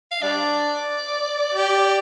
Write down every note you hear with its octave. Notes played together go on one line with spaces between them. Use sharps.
F5
G3 D4 D5
G4